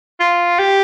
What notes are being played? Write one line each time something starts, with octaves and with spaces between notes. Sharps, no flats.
F4
G4